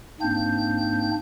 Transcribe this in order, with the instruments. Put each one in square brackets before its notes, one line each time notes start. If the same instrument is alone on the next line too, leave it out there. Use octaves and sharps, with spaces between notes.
[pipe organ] G#2 A#3 C4 D4 G6